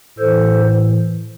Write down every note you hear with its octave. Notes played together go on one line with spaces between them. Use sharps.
A2 E3 A4 C5